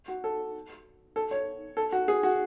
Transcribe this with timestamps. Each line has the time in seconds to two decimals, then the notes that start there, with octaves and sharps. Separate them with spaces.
0.08 F#4
0.24 A4
1.16 A4
1.31 C#5
1.77 A4
1.92 F#4
2.08 G#4
2.23 F#4